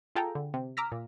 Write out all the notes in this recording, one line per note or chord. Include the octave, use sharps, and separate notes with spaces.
F4 G#4 A4 G5 G#5 A#5
D3
C3
A#5 D6 E6 F6 A#6 B6
A#2